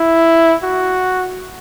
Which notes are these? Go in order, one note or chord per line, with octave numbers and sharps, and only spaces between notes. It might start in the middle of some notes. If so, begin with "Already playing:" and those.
Already playing: E4
F#4